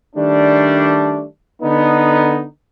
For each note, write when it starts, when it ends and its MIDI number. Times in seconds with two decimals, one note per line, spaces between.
0.16 1.23 51
0.16 1.23 55
0.16 1.23 57
0.16 1.23 62
1.62 2.43 50
1.62 2.43 59
1.62 2.43 63